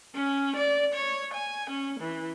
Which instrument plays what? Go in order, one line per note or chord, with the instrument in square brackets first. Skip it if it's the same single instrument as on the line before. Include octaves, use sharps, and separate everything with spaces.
[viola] C#4
D5
C#5
G#5
C#4
E3